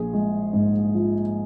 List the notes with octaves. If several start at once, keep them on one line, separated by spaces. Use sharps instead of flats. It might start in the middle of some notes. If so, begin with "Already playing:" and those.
Already playing: A#1 G#4
G#3
G#2
F3